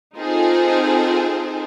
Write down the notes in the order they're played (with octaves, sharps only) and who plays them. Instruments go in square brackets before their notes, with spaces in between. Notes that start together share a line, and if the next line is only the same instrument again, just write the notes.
[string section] C4 D#4 F4 G#4 A4 C5